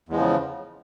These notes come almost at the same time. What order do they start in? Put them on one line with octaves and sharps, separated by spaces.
E2 G#3 F3 C#3